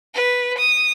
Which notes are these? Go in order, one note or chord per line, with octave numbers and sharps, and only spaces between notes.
B4
D#6